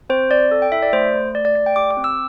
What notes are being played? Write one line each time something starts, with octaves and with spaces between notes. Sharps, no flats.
C4 C5
C4 D5
A4
G5
E4 E5
D5
A3 C5
A3
A3 D5
D5
A3 D5
G5
G4 D6
D6
C4
E6